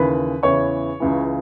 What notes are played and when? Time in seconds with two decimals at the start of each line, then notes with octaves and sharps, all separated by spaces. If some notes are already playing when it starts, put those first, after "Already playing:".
Already playing: D#2 C#3 E3 B4 B5
0.43 E2 C#3 E3 C#5 C#6
1.00 C#2 C#3 E3